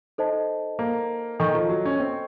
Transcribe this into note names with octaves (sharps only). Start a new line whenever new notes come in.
D#4 A4 C5 D#5 A5
A#3
D#3 A4 D#5 A#5 C#6
F3
F#3
C#4
C4